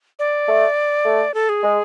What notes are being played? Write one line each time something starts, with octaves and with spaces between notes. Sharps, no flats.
D5
A3
A3
A4
G#4
G#3